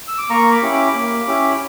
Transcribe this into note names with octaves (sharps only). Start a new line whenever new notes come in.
E6
D6
A#3 A#5 C#6
B5 D6
C#4 E4 G4
B5 D6
A#3
C#4 E4 G4